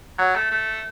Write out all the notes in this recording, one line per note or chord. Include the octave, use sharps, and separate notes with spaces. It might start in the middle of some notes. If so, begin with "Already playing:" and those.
F#3
A3
A3